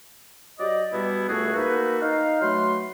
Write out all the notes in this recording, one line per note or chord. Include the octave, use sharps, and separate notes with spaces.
F#3 G4 D5 D#5
B2 G3 B3 E4 G4
C#2 A3 F#4 G#4 A4
A#3 D#4 F#4 A4 B4
D#4 F5
F#3 A3 B4 C6